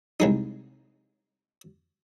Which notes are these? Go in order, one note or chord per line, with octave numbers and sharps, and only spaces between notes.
C2 G#3 D#4